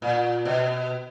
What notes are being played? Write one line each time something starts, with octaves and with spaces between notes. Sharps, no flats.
A#2
B2